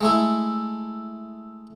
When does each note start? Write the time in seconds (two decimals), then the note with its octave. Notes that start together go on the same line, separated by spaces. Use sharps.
0.01 G#3 A3 E4